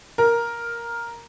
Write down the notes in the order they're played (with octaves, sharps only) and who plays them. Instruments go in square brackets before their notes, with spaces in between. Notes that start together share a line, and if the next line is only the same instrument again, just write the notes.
[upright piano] A#4